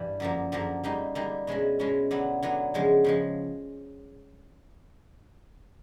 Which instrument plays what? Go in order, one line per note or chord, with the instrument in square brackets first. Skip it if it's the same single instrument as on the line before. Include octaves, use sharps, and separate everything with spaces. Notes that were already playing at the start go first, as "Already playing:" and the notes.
Already playing: [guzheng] G2 E3 G3
F#2 D3 F3 A#3
F#2 D3 F3 A#3
D3 G3 A#3 D#4
D3 G3 A#3 D#4
B2 G#3 C#4 E4
B2 G#3 C#4 E4
D3 F#3 B3 E4
D3 F#3 B3 E4
E2 C#3 F3 G#3
C#3 F3 G#3